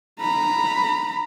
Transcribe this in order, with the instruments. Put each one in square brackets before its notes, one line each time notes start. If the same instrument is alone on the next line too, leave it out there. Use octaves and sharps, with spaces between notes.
[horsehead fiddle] A#5 B5